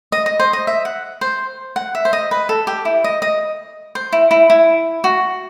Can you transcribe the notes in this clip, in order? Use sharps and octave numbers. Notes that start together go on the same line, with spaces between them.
D#5
D#5
C5
D#5
E5
F#5
C5
F#5
E5
C5
D#5
B4
A4
G4
E4
D#5
D#5
C5
E4
E4
E4
F#4